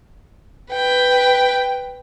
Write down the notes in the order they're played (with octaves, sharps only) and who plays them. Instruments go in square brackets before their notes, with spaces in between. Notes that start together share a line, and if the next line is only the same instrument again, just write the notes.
[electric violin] B4 G5